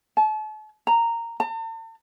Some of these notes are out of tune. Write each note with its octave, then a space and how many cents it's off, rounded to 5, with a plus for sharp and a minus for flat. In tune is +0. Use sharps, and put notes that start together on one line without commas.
A5 -40
A#5 -10
A5 +45